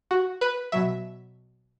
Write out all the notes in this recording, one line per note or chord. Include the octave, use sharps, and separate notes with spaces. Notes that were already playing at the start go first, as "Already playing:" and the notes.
F#4
B4
B2 F#3 E5